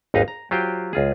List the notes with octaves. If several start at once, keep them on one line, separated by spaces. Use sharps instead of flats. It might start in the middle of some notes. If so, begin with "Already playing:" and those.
G#1 D#2 D#4 B4 D#5 F5
A#5
F#3 F4 G4 C5 G5
C#2 F4 G#4